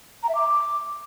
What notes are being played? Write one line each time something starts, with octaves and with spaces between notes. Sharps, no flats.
A#5
E5
D6